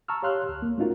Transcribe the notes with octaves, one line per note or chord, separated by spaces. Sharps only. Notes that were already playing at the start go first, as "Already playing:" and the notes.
A5 A#5 C#6 E6 F6
G4 C#5 F5 C6 F6 F#6
D2
A#3
A3 C#4 D#4 F4 F#4 A#4